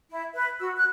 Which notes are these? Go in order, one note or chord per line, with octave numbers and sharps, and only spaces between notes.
E4
B4
F#4 E6
F#6